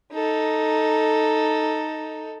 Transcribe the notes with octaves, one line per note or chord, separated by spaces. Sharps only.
D#4 A4